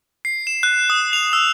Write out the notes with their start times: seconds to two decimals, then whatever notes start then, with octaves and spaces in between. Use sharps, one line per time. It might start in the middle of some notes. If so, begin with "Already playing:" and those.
0.25 C7
0.47 E7
0.63 F#6
0.90 D#6
1.13 F7
1.33 E6